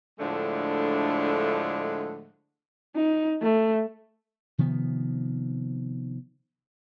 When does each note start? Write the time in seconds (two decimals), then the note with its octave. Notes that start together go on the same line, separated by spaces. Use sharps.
0.19 A2 D3 F3 G#3 A3 D4
2.96 D#4
3.42 A3
4.58 C3 D#3 F3 B3